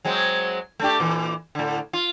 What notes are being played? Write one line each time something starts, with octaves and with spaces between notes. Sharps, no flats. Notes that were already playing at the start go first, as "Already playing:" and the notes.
F#3 G#3 C4
A3 D4 G4
A#2 E3
A2 D3
F4